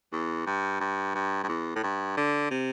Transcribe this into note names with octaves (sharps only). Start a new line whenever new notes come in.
E2
G2
G2
G2
G2
E2
A2
G2
D3
C3